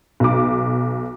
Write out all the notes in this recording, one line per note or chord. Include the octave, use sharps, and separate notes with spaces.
B1 D6